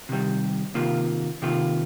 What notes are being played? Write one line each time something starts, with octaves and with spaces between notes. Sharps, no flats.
C3 D#3 G3
C3 D#3 A#3 F4
C3 D#3 A#3 F4